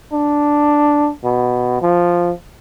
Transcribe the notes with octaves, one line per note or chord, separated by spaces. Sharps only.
D4
B2
F3